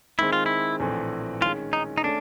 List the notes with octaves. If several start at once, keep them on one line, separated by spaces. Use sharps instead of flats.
D#3 G#3 C4 E4
F4
E4
A#1 A2 E3 A3 C4
D#3 G#3 C#4 F4
D#4
D#4
A3 C#4 D4